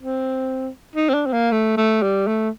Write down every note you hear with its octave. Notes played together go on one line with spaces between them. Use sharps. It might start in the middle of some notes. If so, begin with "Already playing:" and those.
C4
D#4
C4
D4
C4
A#3
A3
A3
G3
A3